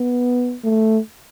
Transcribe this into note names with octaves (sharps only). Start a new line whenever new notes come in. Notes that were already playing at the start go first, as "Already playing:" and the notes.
Already playing: B3
A3